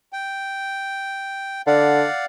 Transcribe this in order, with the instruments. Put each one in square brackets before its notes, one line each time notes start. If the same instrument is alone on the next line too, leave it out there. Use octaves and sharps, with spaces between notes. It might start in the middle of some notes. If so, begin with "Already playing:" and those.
[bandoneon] G5
[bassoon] D3 [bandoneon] D5 F5 F#5